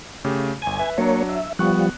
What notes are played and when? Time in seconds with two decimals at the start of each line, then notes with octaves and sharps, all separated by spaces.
0.25 C#3 A3 G4
0.62 G1 G#5 D#7
0.79 B4 E5
0.98 F#3 A#3 D4 C#5
1.29 E5
1.59 F3 G3 B3 C#6 F#6